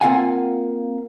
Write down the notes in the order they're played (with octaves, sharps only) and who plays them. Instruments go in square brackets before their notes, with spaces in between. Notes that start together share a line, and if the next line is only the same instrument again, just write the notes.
[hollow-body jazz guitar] A#3 C4 F4 F5 F#5 G#5